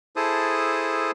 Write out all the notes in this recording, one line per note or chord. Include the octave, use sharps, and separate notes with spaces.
E4 G#4 A4 C5 A5 D#6